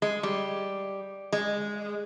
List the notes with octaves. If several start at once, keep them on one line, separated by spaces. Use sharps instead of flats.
G#3
G3
G#3